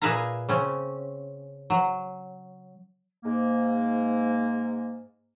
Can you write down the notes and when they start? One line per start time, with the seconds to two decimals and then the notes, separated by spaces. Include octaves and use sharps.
0.02 A#2 G#4 B4 E5 F5 A#5
0.49 C#3 C4 C#4
1.70 F#3
3.23 G#2 A#3